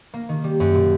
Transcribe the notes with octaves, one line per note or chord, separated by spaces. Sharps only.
A#3
D#3
G3
F#2
A#2